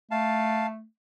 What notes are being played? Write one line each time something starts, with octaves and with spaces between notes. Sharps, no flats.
A3 F5 A5